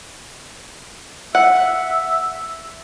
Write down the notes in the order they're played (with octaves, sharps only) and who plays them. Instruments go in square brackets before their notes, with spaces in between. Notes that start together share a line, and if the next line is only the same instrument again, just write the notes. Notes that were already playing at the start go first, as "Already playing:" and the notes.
[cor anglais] E5 [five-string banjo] F#5